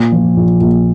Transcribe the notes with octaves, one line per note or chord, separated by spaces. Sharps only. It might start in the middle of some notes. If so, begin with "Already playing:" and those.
Already playing: A#2
F3
A#1
A#1